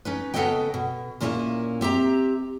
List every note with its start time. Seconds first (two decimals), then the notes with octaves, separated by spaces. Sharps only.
0.05 C#4 D#4 B4
0.34 C#3 B3 A4 B4 D#5 G5
0.74 B2
1.20 A#2 A#3 C#4 E4 C#5 G#5
1.81 C4 G4 E5 A#5